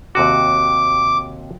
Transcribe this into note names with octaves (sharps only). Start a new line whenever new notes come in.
D#2 C3 F#4 D6